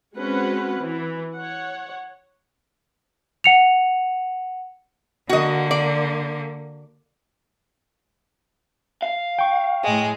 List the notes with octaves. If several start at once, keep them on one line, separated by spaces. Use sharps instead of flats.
G#3 C4 C#4 F#4 B4 F#5
E3
C#5 F#5
F#5 C#7 F7
D3 A#3 F#4 D#5
D5
F5
G5 C#6
A2 G#3